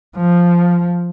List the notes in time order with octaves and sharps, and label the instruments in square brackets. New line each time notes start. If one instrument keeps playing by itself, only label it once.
[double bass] F3